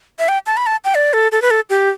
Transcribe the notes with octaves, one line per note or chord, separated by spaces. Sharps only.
E5
G5
A5
B5
A5
G5
D5
A4
A4
B4
A4
G4